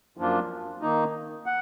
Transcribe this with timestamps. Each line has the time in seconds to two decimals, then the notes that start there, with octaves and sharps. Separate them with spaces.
0.17 F#2 F3 A#3 D4 F4
0.82 D#3 A#3 D#4
1.46 F#5